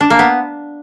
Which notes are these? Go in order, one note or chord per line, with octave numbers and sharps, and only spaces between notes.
D4
A#3
B3